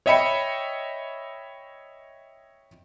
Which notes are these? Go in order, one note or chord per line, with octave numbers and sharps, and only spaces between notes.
C#5 D#5 E5 G5 B5 C#7